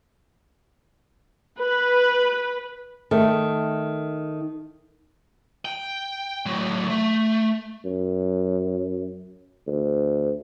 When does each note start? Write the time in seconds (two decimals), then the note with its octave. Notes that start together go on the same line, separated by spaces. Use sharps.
1.59 B4
3.11 D#3 A3
5.65 G5
6.46 A2 F#3
6.90 A3
7.85 F#2
9.67 D2